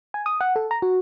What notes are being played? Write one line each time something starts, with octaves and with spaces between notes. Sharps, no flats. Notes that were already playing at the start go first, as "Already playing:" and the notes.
G#5
D#6
F#5
A4
A#5
F#4